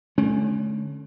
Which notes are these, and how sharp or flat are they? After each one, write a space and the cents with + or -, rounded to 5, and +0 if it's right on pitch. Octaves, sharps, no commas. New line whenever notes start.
D3 +0 A3 -45 C#4 +0